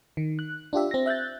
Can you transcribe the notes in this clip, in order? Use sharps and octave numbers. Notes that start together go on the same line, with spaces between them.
D#3
F#6
D4 F4 G4 E5
C4 A#6
E5 F#6 G6 A6